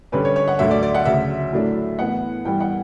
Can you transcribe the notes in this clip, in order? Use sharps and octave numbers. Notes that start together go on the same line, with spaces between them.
G2 D3 G3 C#4 B4
C#5
C#5
F#5
D2 D3 F#3 E5
D5
D5
F#5
D2 C#3 F#3 E5
A2 F#3 A3 D4
A2 E3 B3 F#5
G2 E3 G3 B3 G5
F#5